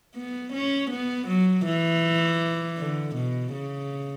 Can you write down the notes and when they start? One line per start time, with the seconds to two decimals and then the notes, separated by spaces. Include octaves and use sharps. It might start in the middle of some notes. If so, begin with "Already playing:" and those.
0.15 B3
0.53 C#4
0.91 B3
1.28 F#3
1.65 E3
2.78 D3
3.15 B2
3.53 C#3